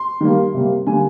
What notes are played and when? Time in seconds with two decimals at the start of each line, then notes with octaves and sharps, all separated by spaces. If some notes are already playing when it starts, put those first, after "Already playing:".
Already playing: C6
0.21 D#3 G3 A#3
0.54 C3 G3 A#3
0.87 D3 G3 A#3 G#5